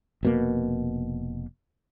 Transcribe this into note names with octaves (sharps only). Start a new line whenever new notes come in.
F1 B2 A#3